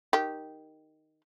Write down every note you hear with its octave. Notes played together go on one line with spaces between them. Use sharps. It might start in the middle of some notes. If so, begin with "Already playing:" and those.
D#3 G4